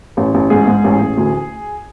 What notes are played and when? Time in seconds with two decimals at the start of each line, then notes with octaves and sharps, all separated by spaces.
0.17 A1
0.34 A1
0.50 G#2 G#4
0.67 G#2
0.84 A1
1.01 A1
1.17 D2